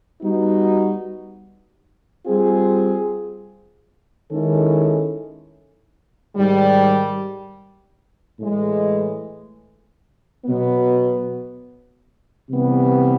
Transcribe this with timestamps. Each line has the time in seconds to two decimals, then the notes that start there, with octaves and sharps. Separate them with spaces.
0.21 G3 B3 D#4 F#4
2.26 G3 C4 F4 G#4
4.31 D#3 G#3 C#4 E4 A4
6.35 G#2 D#3 G3
8.40 A2 E3 G#3
10.45 B2 F#3 B3
12.50 C3 E3 G3 B3